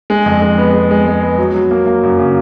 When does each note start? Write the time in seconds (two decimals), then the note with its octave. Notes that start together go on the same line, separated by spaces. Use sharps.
0.10 G#3
0.26 F2
0.42 G#3
0.58 B3
0.74 G#3
0.91 G#3
1.07 G#3
1.23 B3
1.38 F#3
1.55 F#3
1.71 A#3
1.86 A#3
2.03 F#2
2.19 C#3